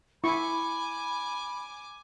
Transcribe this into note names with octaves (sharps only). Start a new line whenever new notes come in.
E4 G#5 B5 C#6 D6